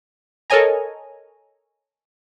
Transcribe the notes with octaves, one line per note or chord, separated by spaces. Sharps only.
A4 A#4 C#5 D#5 G#5 A#5